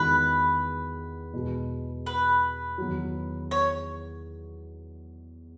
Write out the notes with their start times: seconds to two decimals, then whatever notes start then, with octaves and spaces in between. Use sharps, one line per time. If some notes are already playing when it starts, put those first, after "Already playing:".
Already playing: E2 D#3 G#3 D#4 F#4 B4
1.34 E2 B2 G#3
2.06 B4
2.78 E2 D#3 F#3
3.51 C#5